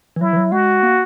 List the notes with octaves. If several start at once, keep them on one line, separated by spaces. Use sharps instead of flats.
E3
F#3 E4
E3
F#3
G#3 F#4
A#3